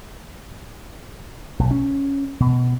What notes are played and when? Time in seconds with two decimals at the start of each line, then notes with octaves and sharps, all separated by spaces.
1.59 B1
1.71 C#4
2.40 B2